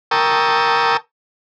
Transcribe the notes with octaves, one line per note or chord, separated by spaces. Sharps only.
A#4 G5 A5 C#6 D#6 E6